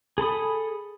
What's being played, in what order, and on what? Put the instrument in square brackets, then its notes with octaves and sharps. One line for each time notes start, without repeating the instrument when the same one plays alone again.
[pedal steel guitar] G#4 A4 B5 D#6